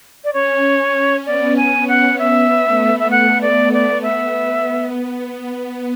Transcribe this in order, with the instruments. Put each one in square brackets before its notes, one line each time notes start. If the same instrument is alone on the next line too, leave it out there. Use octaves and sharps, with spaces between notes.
[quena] D5
[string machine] C#4 [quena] C#5
[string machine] B3 [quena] D5
[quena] G#5
[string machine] C#4
[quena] F#5
[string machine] B3 [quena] E5
[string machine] A3
[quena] E5
[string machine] B3 [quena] F#5
[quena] D5
D5
[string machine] B3 [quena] E5